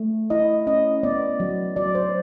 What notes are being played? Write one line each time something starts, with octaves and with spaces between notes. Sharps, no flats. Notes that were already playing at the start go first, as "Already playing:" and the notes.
Already playing: A3
E4 D#5
C#4 D#5
B3 D5
F#3
F#3 D5
C5